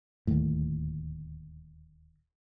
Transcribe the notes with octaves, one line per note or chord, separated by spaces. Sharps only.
D1 D#2 A2